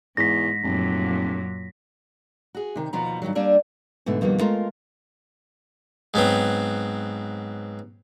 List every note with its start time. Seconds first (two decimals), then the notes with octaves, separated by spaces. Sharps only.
0.17 E2 G#2 A#6 B6
0.63 F1 F#2 A#2 F#3
2.55 F#4 G#4
2.76 C3 D#3
2.93 D#2 B2 F3 B3 A#5
3.22 G2 B2 D#3 F#3
3.35 G3 A#3 D4 D5 E5
4.06 G#2 B2 D3 A3
4.21 F2 B2 D#3 G3 A3 A#3
4.40 G#3 A3 F4 A#4 F5
6.14 G#2 F#3 B3 C4